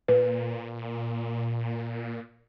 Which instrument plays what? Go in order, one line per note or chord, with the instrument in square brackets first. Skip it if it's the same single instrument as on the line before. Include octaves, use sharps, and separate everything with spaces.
[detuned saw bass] A#2 [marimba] B4